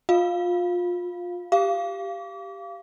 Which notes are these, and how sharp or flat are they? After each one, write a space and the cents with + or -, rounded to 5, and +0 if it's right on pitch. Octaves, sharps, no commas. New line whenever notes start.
F4 +25 F5 +0
G4 +0 F5 -20 D6 -35